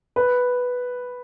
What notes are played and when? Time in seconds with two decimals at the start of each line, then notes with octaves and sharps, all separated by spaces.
0.16 B4